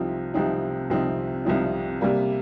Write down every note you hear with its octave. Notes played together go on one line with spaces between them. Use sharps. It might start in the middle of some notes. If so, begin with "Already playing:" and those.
Already playing: C2 C3 F3 C4 D#4
C2 C3 F3 C4 D#4
C2 C3 F3 C4 D#4
C2 C3 F3 C4 D#4
C3 G3 A#3